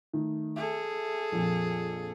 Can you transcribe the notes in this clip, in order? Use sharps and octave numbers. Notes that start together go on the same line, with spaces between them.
D#3 A3
G#4 A4 E5
A#1 F2 A#2